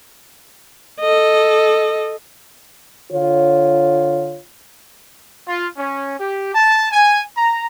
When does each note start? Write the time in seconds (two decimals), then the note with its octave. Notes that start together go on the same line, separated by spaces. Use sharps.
1.00 A4 D#5
3.12 D3 F4 C#5
5.47 F4
5.78 C#4
6.18 G4
6.55 A5
6.92 G#5
7.37 A#5